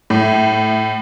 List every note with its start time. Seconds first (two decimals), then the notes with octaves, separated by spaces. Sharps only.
0.10 A2